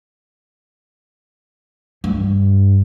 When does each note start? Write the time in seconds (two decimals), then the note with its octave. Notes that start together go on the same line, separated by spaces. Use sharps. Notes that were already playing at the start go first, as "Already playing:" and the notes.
2.04 G2